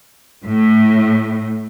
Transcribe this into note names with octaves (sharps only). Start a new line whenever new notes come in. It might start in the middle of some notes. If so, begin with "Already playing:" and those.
A2